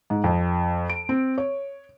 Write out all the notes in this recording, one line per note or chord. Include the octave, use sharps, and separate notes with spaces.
G#2
F2
D7
C4
C#5